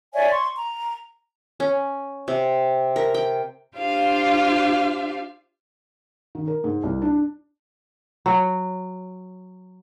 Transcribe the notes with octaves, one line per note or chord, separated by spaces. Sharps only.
C#5 D5 E5 G#5
C6 C#6
A#5
C#4
C3
A#4
G5
D4 F4 G4 C5 F5
D#3
A#4
G#2
C2
D4
F#3